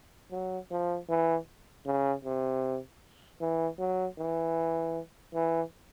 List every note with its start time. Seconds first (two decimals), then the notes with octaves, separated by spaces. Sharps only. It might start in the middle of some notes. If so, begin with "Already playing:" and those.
0.31 F#3
0.71 F3
1.09 E3
1.86 C#3
2.24 C3
3.41 E3
3.79 F#3
4.18 E3
5.34 E3